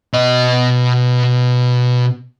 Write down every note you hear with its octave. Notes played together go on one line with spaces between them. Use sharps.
B2 D#5